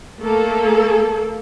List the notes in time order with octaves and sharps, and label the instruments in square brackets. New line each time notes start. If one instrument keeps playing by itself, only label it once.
[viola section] A3 A#3 A4